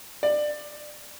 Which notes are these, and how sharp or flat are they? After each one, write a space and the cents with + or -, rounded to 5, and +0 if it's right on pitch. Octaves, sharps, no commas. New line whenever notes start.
D5 +20